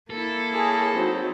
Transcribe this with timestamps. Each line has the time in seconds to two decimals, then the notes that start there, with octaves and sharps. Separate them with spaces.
0.10 A#3 E4 A4
0.52 G#4 A#4 C#5 A5
0.95 F#3 C4 D#4